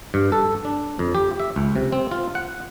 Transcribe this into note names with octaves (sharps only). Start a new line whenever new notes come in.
G2
A4
D4
F2
G4
E5
C#2
C3
C4
F4
F#5